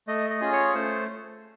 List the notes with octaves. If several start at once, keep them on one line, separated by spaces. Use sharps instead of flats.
A3 D#5
D#5
C#4 F4 G#4
C#5
A3 C5